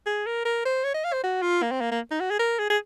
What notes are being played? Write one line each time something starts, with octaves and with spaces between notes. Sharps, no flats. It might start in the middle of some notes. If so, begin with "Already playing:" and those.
G#4
A#4
A#4
C5
C#5
D#5
F5
C5
F#4
F4
A#3
C4
A#3
A#3
D#4
F#4
G#4
A#4
G#4
G#4